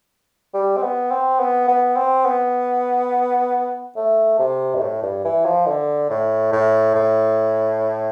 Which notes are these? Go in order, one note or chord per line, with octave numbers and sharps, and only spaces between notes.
G3
C4
B3
C4
B3
B3
C4
B3
A3
C3
G2
A2
G2
E3
F3
D3
A2
A2
A2